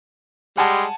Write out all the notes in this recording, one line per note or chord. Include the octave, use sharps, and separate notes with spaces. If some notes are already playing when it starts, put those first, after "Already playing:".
G3 G#3 F#5 G#5 A5